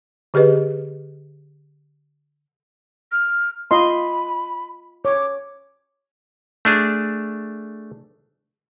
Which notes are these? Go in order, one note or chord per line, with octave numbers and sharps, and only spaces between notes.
D3 G4 G#4 B4 D#5
F6
F4 D#5 B5 C6
C#5 D6
A3 D4 G#4